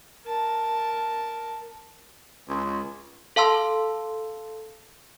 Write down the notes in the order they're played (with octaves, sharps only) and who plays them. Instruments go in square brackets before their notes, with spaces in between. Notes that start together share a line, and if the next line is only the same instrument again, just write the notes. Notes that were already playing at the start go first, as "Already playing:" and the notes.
[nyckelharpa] A#4 A5
[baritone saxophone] C#2
[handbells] A4 F5 A5 C6 E6